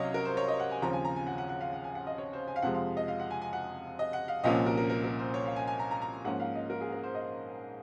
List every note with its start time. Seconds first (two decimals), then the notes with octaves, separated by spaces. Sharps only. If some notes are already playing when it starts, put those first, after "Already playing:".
Already playing: C2 C3 F#3 C#4 C#5 D#5 F5
0.14 A#4
0.25 C5
0.37 C#5
0.48 D#5
0.60 F#5
0.71 G#5
0.82 D#2 C#3 F3 C4 A#5
0.93 G#5
1.05 A#5
1.16 G#5
1.27 F#5
1.38 F#5
1.49 F#5
1.61 F5
1.73 F#5
1.84 G#5
1.95 F#5
2.07 D#5
2.18 C#5
2.33 C5
2.48 G#5
2.56 F5
2.62 F2 C3 F3 G#3 C4 F#5
2.74 F5
2.97 D#5
3.08 F5
3.20 F#5
3.31 G#5
3.42 G#5
3.53 F#5
3.99 D#5
4.13 F#5
4.28 F5
4.44 C2 A#2 F3 A#3 C#4 D#5
4.66 A#4
4.77 A#4
4.90 A#4
5.04 A#4
5.19 C5
5.34 C#5
5.46 F5
5.56 G#5
5.67 G#5
5.79 A#5
5.91 A#5
6.02 A#5
6.25 G#2 F3 A#3 C#4 F#5
6.40 F5
6.55 D#5
6.70 A#4
6.81 G#4
6.92 A#4
7.03 C5
7.15 D#5